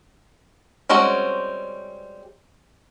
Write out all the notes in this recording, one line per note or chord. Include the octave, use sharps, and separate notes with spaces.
G3 G#3 C4 C#4 F#4